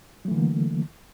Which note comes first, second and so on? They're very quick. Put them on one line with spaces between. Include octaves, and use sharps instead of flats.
F#3 A3 E3 D3 A#3